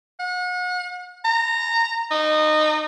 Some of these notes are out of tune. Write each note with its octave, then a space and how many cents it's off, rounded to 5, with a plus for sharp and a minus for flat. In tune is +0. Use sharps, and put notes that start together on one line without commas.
F#5 -40
A#5 -20
D#4 -20